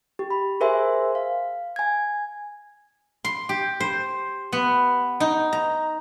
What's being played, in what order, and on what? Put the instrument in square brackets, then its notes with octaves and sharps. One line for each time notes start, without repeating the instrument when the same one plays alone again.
[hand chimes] G4
B5
G#4 A#4 C5 E5 G#5 C6
F5
G#5 G#6
[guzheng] C6
G4
C5
B3
D#4
A#5